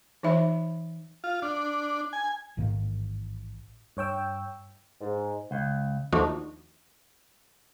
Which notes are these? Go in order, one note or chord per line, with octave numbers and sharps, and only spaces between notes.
E3 D#4 C5 E5 B5
F4
D4
G#5
A1 G#2 D#3 A#3
G2 C#5 G5 E6
G#2
C#2
D#2 F3 A3 D4 D#4 F#4